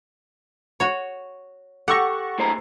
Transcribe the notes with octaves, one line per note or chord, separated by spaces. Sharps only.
F#4 C#5
G4 A4 F#5 C#6 E6 A#6
A2 C5 A#5